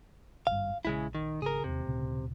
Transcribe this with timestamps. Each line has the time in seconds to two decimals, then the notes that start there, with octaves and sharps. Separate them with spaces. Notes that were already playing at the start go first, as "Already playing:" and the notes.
0.47 G#1 G2 F5
0.85 A#1 C#3 G#3 E4
1.15 D#3
1.42 G#1 C#3 G#4 A#4
1.64 E1 D#2 C3
1.86 D2 A#2 C#3